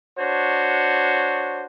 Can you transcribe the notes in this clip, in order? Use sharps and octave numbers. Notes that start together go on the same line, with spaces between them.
D4 F#4 C5 C#5